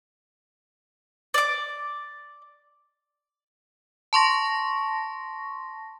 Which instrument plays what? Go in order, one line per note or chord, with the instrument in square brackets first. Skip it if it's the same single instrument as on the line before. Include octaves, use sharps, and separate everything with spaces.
[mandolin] D5 D6
[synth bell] A5 C6 C#6 A#6